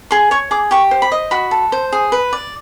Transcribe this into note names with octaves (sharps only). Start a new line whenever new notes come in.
G#4 C6
C#5 C#6
G#4 D6
G4 C#6
C5
B5
D#5
F#4 B5
A4
C5
G#4
B4
D5